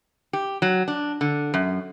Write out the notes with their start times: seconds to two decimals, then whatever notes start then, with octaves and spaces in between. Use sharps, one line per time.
0.33 G4
0.62 F#3
0.88 D4
1.21 D3
1.54 F#2